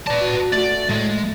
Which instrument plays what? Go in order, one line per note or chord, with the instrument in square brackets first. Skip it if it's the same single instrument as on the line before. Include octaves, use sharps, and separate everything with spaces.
[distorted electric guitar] B4 A5 [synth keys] D5 A#5 D6
[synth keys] F#4
[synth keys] A3 F#4 [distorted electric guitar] D5
[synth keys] A2 A3 [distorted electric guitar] G#3